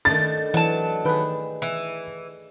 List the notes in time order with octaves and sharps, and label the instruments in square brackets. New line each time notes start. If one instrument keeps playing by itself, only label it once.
[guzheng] D#3 A3 D4 [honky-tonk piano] A6
[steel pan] E3 [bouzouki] F#3 A5
[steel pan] D#3 B4 [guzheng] G#4 G5
[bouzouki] E3